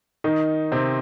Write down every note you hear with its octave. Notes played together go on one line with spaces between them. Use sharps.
D#3 D#4
C3 C4